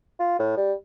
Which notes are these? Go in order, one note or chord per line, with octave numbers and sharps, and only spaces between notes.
F4
A2
G3